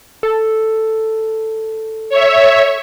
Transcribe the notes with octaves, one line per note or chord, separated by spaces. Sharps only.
A4
C#5 E5